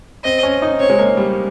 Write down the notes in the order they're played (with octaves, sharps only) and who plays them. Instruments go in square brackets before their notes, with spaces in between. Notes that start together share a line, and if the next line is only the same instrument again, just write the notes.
[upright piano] C4 [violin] D#5
[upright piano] C#4
D#4
[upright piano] C4 [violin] C#5
[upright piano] G#3
A#3
G3